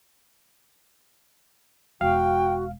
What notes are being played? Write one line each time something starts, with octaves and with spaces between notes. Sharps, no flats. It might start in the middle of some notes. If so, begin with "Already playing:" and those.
E1 F#4 F5 G5